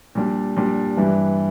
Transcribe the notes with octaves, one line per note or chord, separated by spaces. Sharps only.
A#2 G3 D4
A#2 G3 D4
G2 E3 G3